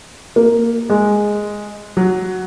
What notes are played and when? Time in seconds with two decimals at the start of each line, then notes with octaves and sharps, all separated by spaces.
0.36 A#3
0.90 G#3
1.97 F#3